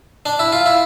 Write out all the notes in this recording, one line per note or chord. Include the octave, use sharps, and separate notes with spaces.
D4
E4
F4
E4